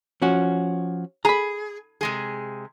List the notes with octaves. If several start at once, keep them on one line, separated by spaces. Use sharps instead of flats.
F3 C#4 F#4
G#4 A#5 B5
C3 G#3 G#4